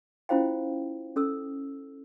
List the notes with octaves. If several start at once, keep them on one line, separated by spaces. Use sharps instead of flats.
C#4 E4 F4 C5 F5 G5
C#4 A4 E6